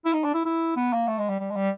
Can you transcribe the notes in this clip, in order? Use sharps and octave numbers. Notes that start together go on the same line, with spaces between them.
E4
D#4
D4
E4
E4
B3
A#3
A3
G#3
G3
G3
G#3
G3